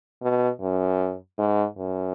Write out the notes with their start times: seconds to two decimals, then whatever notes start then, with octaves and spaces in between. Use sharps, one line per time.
0.22 B2
0.61 F#2
1.38 G#2
1.77 F#2